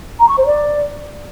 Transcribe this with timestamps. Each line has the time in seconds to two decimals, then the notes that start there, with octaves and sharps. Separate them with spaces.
0.20 A#5
0.28 C#6
0.37 C5
0.46 D5